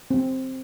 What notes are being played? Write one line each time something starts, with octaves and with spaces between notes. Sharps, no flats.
C4